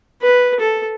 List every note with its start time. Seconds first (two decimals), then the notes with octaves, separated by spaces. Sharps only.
0.22 B4
0.60 A4